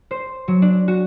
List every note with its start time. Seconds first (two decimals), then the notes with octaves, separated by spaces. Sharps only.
0.11 C5
0.48 F#3
0.62 D4
0.88 F#4